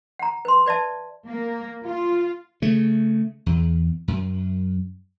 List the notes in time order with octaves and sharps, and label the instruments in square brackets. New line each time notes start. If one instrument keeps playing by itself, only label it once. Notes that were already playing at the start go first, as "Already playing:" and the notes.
[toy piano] F#5 A#5
B4 C6
B4 D5 E5 A5
[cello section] A#3
F4
[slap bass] C#3 A3
E2
F#2